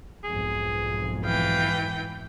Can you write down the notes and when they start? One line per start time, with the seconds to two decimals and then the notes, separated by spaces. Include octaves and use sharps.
0.24 B1 F2 G#2 G#4
1.25 E3 F5 G5